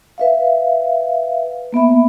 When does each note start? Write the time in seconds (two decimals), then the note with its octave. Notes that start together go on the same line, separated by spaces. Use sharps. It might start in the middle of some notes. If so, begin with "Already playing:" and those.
0.18 B4 E5 F5
1.72 A#3 B3 E5 B5